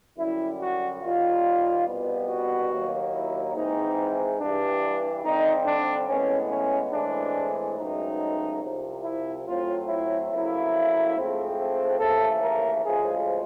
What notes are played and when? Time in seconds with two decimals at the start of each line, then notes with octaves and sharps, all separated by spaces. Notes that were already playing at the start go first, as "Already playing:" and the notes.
0.17 F#2 D3 G3 E4
0.60 F#4
1.02 D#2 D#3 G3 A#3 F4
1.86 C2 B2 G3 B3
2.29 F#4
2.71 D#2 D#3 F#3 A#3
3.13 E4
3.55 G#2 E3 G#3 C4 D#4
4.40 G2 E3 G3 D4
5.23 F2 D3 G3 C4 D#4
5.66 D4
6.08 A2 E3 G#3 B3 C#4
6.50 C#4
6.92 A2 E3 G#3 C4 D4
7.77 C#2 B2 F#3 A3 C4 D#4
8.61 C2 C3 F3
9.03 E4
9.46 A2 F#3 A3 C4 F4
9.88 E4
10.30 F2 C#3 F#3 A#3 E4
11.15 G#2 F3 A3 C4
11.99 D#2 C#3 E3 A3 A4
12.41 A#4
12.84 D2 C#3 F3 G#3 G#4